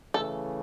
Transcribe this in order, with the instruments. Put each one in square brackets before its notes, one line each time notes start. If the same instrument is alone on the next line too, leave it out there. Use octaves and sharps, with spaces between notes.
[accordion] C#3 E3 A3 [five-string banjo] A4